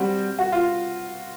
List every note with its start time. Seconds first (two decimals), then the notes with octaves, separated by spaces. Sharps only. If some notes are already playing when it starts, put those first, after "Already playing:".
Already playing: G3 C4 F#4
0.39 F#4
0.52 F4